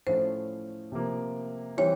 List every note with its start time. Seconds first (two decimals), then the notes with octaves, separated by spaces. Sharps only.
0.07 A2 F3 A3 C#4 C5
0.92 C3 F3 A#3
1.77 E3 G3 C4 C#5